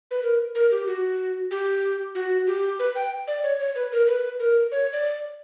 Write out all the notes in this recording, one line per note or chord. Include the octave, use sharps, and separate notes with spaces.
B4
A#4
A#4
G4
F#4
G4
F#4
G4
B4
G5
D5
C#5
C#5
B4
A#4
B4
A#4
C#5
D5